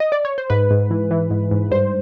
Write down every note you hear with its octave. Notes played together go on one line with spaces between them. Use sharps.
D#5
D5
C#5
C5
G#2 B4
G#2
E3
E3
G#2
G#2
G2 C5